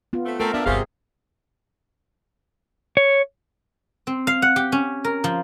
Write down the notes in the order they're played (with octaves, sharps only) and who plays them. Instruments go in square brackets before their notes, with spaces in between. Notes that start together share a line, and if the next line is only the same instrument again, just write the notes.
[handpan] B3 F4
[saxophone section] A3 C4
[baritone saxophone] A3 [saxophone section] C4 [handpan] A#4
[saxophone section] A2 F3 E5 [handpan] B3 [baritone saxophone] D4
[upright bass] G1 D#2 [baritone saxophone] C3 [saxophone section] G3 F#4 F5 [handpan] G#4
[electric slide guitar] C#5
[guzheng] C4
F5
F#5
G4
C#4
A#4
F3